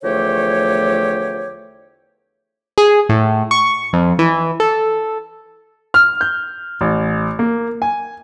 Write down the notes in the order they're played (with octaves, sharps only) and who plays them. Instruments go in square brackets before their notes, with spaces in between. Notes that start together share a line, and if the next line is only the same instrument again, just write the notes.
[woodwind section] E2 D3 F3 A3 G4 C#5
[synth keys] G#4
A2
C#6
F2
E3
A4
[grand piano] F6
G6
A1
A#3
G#5